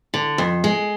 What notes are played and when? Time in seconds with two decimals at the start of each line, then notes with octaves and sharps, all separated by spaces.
0.14 D3
0.38 F2
0.64 G#3